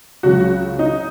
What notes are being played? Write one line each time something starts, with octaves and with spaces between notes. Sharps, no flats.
C#2 C#3 F#3 F#4
D#4